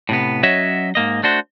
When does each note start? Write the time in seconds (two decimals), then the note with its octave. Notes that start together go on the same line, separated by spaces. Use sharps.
0.09 A2 C3 B3
0.43 F#3 C#4 F#4 C#5 D#5 E5
0.95 G#2 A#3 D#5
1.23 A3 D4 F#4 C5